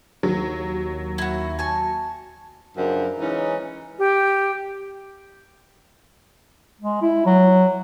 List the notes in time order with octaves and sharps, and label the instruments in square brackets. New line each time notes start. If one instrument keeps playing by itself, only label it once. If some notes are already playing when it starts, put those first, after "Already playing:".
[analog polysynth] D#2 [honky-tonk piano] F#3
[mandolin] E4 F#4
G#5 A5 C#6
[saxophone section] F#2 C#3 F3 D4 A#4
E3 G#3 C#4 D#4
[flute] G4
[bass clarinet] G#3
E4
F#3